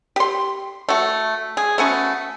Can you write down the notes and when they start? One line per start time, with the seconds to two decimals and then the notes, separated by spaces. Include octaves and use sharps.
0.16 G4 C6
0.89 A3 F#4
1.57 G#4
1.78 A3 B3 C#4 F#4